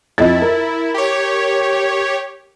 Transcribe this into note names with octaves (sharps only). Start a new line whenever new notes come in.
F2 E4 D#5 A6
A#4
G4 C#5